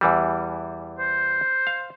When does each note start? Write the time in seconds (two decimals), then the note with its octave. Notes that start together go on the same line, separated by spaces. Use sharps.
0.01 E2 E3 G3
0.98 C5
1.67 F5